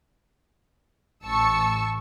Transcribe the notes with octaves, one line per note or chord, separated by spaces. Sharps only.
A1 A5 C#6 E6 C#7